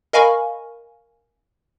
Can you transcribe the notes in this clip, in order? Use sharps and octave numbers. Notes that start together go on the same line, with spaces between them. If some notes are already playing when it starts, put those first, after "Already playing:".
A#4 D#5 F5 G#5 B5 C#6